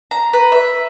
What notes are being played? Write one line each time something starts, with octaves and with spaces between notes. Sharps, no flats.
A#5
B4
E5